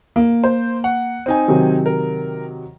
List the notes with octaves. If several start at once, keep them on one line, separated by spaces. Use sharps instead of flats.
A#3
C5
F#5
C4 D#4 G#5
C3 D#3 F#3
A#4